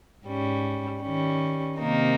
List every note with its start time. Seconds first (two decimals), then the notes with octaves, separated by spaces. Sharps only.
0.25 G#2 G3 C#4
1.02 D#3 G3 C#4
1.78 C3 D#3 A#3 D#4